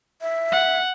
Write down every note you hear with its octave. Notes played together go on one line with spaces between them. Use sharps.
E5
F#5